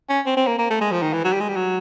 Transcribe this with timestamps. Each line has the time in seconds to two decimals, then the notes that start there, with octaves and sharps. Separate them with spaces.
0.09 C#4
0.26 C4
0.37 C4
0.47 A#3
0.59 A#3
0.70 A3
0.81 G#3
0.92 F3
1.02 D#3
1.13 E3
1.24 F#3
1.33 G3
1.41 G#3
1.49 G3
1.57 F#3